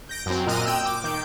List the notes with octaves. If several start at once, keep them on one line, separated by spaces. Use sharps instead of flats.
G6 A#6 D7
F#2 C4
A#2 D#5 F6 F#6 D#7
G5 E6
D6
D#3 G6 D7